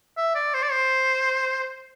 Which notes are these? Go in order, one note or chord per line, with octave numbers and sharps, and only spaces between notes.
E5
D5
C5
D5
C5